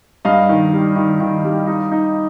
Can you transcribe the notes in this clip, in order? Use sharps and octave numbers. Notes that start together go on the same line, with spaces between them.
G2 D#5 F5
D#3
G3
D#3
D#3
G3
D#4
D#4